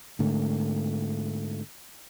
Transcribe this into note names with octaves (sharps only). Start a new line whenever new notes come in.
G#2 D3 A3